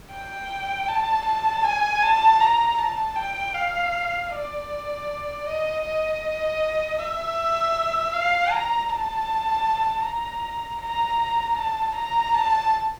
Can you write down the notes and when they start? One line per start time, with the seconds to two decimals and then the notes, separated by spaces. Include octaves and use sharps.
0.10 G5
0.88 A5
1.26 A5
1.64 G#5
2.02 A5
2.41 A#5
2.78 A5
3.16 G5
3.55 F5
4.31 D5
5.46 D#5
5.85 D#5
6.99 E5
8.13 F5
8.51 A#5
8.90 A5
10.05 A#5
10.81 A#5
11.57 A5
11.95 A#5
12.34 A5